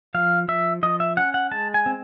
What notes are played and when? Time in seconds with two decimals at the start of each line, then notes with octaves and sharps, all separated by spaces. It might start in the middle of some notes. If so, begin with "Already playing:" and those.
0.14 F3 F5
0.48 F3 E5
0.83 F3 D#5
1.00 E5
1.17 C#4 F#5
1.34 F#5
1.51 G#3 A5
1.74 G#5
1.86 C4